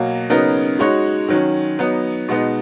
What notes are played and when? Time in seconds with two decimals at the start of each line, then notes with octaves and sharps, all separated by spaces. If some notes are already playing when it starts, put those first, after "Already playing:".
Already playing: B2 F#3 A#3
0.30 C#3 F#3 B3 D#4 A#4
0.79 G#3 D#4 F#4 C#5
1.29 D#3 F#3 C#4
1.79 F#3 B3 D#4
2.28 B2 G#3 B3 D#4